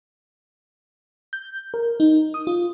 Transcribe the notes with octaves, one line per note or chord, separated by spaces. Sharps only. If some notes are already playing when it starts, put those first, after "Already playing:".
G6
A#4
D#4
D#6
F4